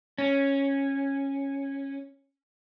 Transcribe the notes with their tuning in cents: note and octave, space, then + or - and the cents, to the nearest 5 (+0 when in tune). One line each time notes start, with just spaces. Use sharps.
C#4 -10